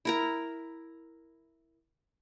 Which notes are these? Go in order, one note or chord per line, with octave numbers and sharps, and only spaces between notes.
E4 A#4 A#5